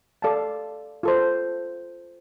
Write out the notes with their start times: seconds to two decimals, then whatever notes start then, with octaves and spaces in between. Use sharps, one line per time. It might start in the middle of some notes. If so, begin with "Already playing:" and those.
0.22 A4 D5 F5 A5
1.03 F4 A4 C5